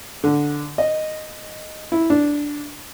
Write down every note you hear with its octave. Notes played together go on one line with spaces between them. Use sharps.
D3
D#5
E4
D4